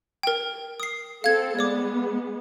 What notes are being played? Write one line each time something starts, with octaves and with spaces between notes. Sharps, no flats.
A#4 G5
D#6 C7
C4 A4 F5 G#6
G#3 B3 D5 D6